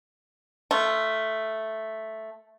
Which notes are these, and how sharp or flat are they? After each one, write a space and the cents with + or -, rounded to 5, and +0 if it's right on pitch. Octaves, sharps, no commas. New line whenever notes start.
A3 +0 F4 -15